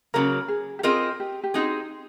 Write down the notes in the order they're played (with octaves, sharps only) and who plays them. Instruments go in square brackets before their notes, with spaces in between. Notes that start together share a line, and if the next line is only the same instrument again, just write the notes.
[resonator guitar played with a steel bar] C#3 F#3 A#3 [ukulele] A#4
[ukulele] G#4
G4
[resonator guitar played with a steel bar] C4 F4 A#4 D#5 [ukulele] G#4
[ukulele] G4
G4
[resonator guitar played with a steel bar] C4 D#4 G#4 [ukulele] F#4